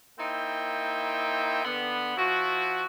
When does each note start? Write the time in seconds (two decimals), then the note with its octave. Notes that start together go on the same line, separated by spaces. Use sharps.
0.19 A#3 C4 D#4 E4 G5
1.65 D3 B3
2.17 F3 E4 F#4